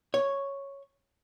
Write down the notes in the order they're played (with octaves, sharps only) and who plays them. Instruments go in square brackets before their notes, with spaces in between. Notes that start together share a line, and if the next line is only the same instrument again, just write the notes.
[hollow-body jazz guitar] C#5